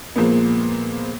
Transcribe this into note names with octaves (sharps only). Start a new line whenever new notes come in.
A#2 F3 G#3 A#3 B3